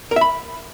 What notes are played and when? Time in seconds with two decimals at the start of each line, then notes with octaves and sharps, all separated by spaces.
0.11 A#4
0.16 E5
0.21 B5